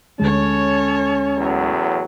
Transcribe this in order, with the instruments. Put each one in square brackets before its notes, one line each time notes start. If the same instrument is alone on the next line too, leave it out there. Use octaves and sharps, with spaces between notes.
[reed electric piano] D2 G#3 [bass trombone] C#4 [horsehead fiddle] A4 C#5
[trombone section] E2 A2 F#3